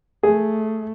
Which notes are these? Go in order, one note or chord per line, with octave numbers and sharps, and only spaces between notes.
A3 G#4